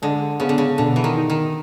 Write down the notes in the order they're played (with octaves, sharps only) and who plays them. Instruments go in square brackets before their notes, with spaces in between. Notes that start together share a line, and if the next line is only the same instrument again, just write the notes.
[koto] D3 [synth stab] G#3
[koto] C#3 [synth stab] B3
[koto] D3
C#3
[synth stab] B2 [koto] D3
[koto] E3
D#3
[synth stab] D#4
[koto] D#3